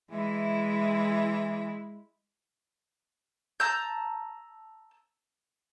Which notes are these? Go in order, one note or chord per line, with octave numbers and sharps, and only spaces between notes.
E3 G#3 E4
A5 A#5 E6 G6